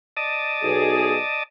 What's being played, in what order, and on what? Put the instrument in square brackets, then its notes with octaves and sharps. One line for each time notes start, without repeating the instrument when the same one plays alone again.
[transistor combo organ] D5 D#5 A5
[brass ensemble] B1 G#4